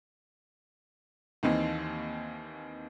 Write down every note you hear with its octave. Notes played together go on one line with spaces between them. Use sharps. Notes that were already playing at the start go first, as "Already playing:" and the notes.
D#2 D#3 E3 C4 D#4